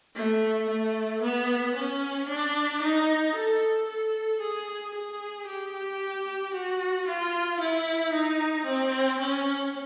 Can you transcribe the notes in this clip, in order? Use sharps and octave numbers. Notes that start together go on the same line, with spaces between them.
A3
A3
B3
C#4
D4
D#4
A4
A4
G#4
G#4
G4
F#4
F4
E4
D#4
C4
C#4